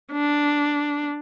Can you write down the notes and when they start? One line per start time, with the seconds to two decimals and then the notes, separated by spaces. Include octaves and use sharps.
0.12 D4